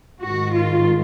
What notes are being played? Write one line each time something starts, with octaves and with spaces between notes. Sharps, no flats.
G#2 D#3 F#4
F4